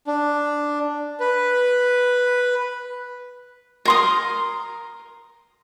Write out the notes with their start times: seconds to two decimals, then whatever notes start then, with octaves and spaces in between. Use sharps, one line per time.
0.07 D4
1.20 B4
3.85 A#4 C6 D#6